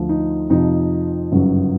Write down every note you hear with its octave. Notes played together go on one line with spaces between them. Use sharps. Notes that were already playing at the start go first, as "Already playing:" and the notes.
Already playing: D2 D3 F3
D#4
F2 C3 F3 D#4
G1 F#2 C#3 F#3